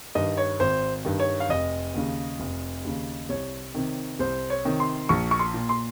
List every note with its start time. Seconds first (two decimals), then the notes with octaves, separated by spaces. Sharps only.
0.15 G2 D#3 D#5
0.37 C#5
0.60 G#1 C5
1.05 G2 D#3
1.20 C#5
1.40 F5
1.49 F1 D#5
1.94 D#2 C#3
2.40 F1
2.85 D#2 C#3
3.29 C2 C#5
3.74 C3 D#3
4.19 C2 C5
4.50 C#5
4.65 C3 D#3
4.80 C6
5.09 A#1 C#6
5.31 C#6
5.39 C6
5.54 A#2
5.69 C6